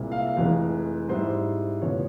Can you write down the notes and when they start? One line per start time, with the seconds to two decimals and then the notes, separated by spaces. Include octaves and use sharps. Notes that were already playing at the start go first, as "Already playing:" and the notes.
Already playing: C2 A#2 G#3 C4 E4
0.12 F5
0.19 E5
0.27 F5
0.36 F1 F2 E3 G#3
1.09 G#2 G3 C4 E4 C5
1.82 F1 E2 C#3 F3 C#5